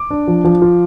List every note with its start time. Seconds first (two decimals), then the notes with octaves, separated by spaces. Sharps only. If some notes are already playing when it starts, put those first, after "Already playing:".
Already playing: D6
0.11 D4
0.28 F3
0.44 F3
0.62 F4